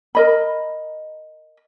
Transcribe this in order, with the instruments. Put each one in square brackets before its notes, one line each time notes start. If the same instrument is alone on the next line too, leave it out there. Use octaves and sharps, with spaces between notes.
[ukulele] A#4 D#5 B5